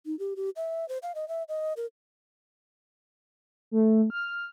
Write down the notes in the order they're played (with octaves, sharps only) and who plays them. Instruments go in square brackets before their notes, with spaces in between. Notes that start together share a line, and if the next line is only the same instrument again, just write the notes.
[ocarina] D#4
G4
G4
E5
C5
F5
D#5
E5
D#5
A#4
[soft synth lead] A3
F6